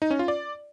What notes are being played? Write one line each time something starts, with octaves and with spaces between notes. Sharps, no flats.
D#4
C#4
F4
D5